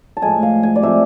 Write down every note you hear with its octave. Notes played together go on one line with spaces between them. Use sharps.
A5
A2 F3 G#3 G#5
F5
G#5
D5
C3 F3 A3 C4 E5